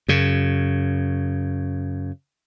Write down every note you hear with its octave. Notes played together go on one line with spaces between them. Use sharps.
F#2 C#3